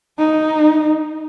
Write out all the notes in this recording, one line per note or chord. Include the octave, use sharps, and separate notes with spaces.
D#4